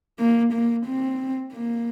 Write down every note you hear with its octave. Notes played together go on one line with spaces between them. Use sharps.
A#3
A#3
C4
A#3